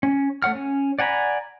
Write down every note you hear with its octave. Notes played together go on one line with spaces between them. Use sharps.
C#4
A3 C#5 F#5 F6
C#4
D5 F#5 G#5 A#5 B5